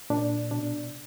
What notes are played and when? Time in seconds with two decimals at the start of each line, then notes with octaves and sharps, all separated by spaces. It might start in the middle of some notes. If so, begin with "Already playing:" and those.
0.10 A#2 D4
0.51 B2 D4